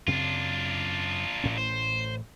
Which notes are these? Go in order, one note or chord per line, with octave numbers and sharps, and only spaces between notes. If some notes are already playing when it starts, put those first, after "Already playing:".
F#2 C#3 C4 D4 F4
A1 A2 C#4
C5